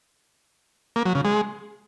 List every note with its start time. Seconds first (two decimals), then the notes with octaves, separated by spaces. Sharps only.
0.96 A#3
1.06 F#3
1.15 C#3
1.25 G#3